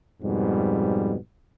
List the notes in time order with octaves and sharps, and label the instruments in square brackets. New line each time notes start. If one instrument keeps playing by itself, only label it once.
[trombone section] F2 G#2 B2 G3